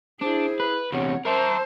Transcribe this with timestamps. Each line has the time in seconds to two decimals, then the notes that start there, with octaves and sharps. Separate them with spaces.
0.21 D4 E4 G#4 C5
0.60 B4
0.93 E2 C3 C#5 F#5
1.25 A#4 C5 E5 A5